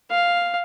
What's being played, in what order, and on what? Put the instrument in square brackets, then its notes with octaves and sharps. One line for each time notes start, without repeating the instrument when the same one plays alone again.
[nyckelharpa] F5